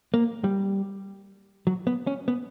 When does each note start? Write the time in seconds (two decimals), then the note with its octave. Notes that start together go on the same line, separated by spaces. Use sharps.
0.14 A#3
0.44 G3
1.67 F#3
1.87 B3
2.07 C#4
2.28 B3